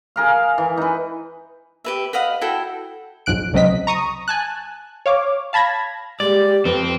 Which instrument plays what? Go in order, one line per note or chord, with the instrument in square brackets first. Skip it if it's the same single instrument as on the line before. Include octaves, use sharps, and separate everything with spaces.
[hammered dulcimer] G#4 A#4 F5
E3
D#4 B4
[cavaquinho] G4 B4 E5
B4 D#5 F5 F#5
E4 F#4 A4 G5
[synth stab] B1 F2 G#2 F#6 D7
C2 C#3 F#3 C4 D#5 B6
A#5 C#6 D#6
G#5 A5 F#6
C#5 F5 D6
F5 A5 B5 G#6 A#6
[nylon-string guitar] G#3 A#3 [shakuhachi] G4 [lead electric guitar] D5
[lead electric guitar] F2 [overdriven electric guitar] C4 [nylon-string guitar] A4 B4